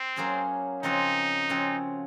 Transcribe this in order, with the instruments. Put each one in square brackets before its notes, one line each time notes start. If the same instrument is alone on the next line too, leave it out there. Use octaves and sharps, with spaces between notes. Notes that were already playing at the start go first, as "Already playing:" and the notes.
Already playing: [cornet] C4
[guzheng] F#3 A#3 C#4 G#4 C5
[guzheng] C#3 F3 C4 F#4 C#5 [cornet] D#4
[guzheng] C#3 F3 C4 F#4 C#5